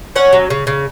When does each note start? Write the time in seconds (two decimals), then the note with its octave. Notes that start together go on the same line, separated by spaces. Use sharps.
0.15 C#4 C#5 F#5
0.33 F#3
0.50 C#3
0.67 C#3